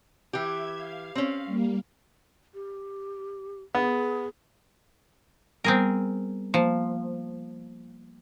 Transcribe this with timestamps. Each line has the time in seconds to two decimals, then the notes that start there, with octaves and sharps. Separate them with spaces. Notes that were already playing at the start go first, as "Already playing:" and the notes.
0.33 E3 G4 E5 G#6
0.74 F5
1.15 C4 C#4
1.45 G3 A#3
2.54 G4
3.75 B3 G#4
5.64 G3 B3 C4 G#4 A#4
6.54 F3 A#3